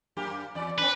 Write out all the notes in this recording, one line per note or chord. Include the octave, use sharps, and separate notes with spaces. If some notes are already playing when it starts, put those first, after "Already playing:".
F#2 A#3 G4
E2 D5
C4 D4 B4